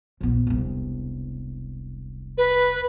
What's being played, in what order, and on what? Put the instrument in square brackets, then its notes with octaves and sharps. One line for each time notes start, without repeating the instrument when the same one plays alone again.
[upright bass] A#1 B3
E1 C2
[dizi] B4